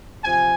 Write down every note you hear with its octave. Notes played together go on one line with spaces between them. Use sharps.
C3 F3 G#5